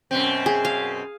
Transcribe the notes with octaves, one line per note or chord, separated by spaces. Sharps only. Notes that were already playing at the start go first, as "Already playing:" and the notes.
F#2 B2 C4
G#4
F5